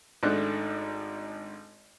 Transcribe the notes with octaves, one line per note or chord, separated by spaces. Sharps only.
G#1 G#2 A3 D4 F#6